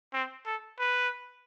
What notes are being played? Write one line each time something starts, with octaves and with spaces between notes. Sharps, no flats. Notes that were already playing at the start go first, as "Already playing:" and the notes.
C4
A4
B4